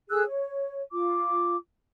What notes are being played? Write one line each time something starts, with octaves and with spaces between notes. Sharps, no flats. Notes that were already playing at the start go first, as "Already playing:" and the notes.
G#4 A4 E6 F#6
C#5
F4 D6